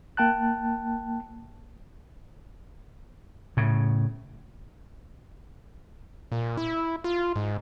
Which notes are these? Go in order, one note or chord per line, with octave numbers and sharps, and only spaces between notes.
A#3 G5 A5 F#6
A2 C#3
A#2
E4
F4
G#2